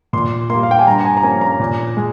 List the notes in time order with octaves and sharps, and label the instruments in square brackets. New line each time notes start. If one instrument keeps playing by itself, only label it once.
[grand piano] A#2 C6
A#3 C6
G3
F5
G5
G#5
G2 A#5
G#5
A#5
F3 A#3 C#4 G#5
A#5
A#2
G#3